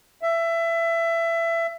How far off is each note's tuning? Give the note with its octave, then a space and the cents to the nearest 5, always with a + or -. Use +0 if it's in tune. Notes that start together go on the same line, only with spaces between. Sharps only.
E5 +20